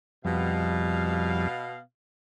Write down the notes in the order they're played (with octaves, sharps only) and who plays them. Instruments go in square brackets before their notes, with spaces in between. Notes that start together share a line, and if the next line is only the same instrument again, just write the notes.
[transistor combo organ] F2 G3 [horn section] B2 F5